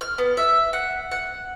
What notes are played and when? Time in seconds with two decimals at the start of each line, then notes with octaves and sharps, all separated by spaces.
0.01 F6
0.18 B3
0.37 E5
0.73 F#5
1.11 F#5